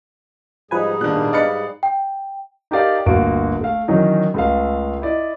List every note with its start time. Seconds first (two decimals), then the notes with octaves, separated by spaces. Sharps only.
0.71 G#2 F3 G3 D#4 G#4 B4 G#5
1.01 A#2 D#3 A#3 B3 D4 F#6
1.33 D#4 B4 D5 F5 C#7
1.83 G5
2.71 D#4 G4 A4 A#4 D5 F5
3.06 G1 D2 A#3 F#4 D7
3.61 A3 F5
3.88 D#3 E3 F#3 C#4 D#4
4.34 C#2 A3 F5
5.02 E4 D5 D#5